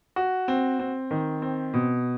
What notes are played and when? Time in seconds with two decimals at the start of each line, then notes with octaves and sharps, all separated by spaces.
0.16 F#4
0.48 C4
0.79 C4
1.11 D#3
1.42 C4
1.74 B2